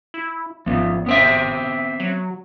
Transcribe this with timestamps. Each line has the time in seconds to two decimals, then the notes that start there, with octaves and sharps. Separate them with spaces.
0.14 E4
0.66 G#1 F3 B3
1.06 B3 C4 E5
2.00 F#3